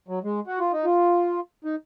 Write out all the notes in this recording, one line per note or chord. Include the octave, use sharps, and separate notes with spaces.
F#3
G#3
F#4
F4
D#4
F4
D#4